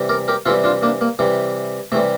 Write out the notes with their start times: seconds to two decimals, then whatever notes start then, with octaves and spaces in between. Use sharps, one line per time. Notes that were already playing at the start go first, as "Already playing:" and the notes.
Already playing: C3 E3 G3
0.09 A#4 D5
0.28 G4 A#4
0.46 C3 E3 G3 F4 A4
0.64 D4 F4
0.82 A#3 D4
1.01 A#3
1.19 C3 E3 G3
1.92 C3 E3 G3 A3